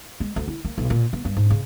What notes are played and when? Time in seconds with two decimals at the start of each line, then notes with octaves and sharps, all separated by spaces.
0.20 G#3
0.36 D2
0.48 E4
0.65 A#3
0.78 B1
0.90 A#2
1.13 B3
1.25 G2
1.37 G#2
1.50 C#3